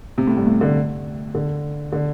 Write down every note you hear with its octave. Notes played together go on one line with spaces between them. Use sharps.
C3
A2
G2
A2
D3
D3
D3